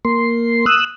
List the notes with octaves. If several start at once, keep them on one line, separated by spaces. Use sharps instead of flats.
A#3 C6
D#6 E6 F#6